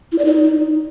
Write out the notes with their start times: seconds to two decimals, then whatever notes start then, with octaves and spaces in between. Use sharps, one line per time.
0.12 E4
0.19 D5
0.25 D#4